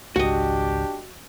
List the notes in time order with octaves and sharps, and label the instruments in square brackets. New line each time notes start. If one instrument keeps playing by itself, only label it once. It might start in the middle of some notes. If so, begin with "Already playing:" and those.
[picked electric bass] G#1 C#2 G#3 [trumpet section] D4 G4 [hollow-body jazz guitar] F#4 D#5